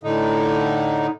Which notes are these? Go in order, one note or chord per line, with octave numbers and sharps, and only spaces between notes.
A2 D3 D#4